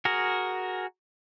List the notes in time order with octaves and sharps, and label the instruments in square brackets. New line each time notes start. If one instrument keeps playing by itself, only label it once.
[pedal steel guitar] F#4 G#4 A#4